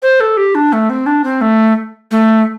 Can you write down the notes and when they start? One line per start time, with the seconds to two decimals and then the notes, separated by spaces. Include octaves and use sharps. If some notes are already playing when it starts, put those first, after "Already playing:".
0.03 C5
0.20 A4
0.37 G4
0.55 D4
0.73 A3
0.90 C4
1.06 D4
1.24 C4
1.41 A3
2.11 A3